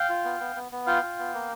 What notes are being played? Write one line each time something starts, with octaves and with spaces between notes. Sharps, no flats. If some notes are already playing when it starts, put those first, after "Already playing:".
Already playing: F5 G5
F4
B3
B3
B3
B3
F4 F5 G5
F4
B3
A#3